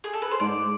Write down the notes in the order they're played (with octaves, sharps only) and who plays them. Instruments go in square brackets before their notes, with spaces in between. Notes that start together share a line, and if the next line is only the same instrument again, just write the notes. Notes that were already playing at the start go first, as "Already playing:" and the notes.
[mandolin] G#4
A4
B4
C5
[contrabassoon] G#2 [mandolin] D5